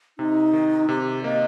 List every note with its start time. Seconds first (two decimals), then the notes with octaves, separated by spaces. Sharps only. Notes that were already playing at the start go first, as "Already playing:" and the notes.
0.19 C3 D#4
0.53 D#3
0.89 C3 G4
1.24 A#3 D#5